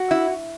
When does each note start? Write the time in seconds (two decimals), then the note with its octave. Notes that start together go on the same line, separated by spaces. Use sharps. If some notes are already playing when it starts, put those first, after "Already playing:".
Already playing: F#4
0.11 E4